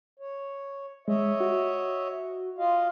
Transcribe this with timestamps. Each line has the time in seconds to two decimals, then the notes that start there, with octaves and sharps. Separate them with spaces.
0.20 C#5
1.08 G#3 C#5 D#5 E5
1.40 F#4
2.58 F4 D#5 F5